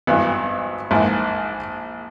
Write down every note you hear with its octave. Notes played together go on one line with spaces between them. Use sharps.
G#1 G2 E3 B3
A#1 G#2 E3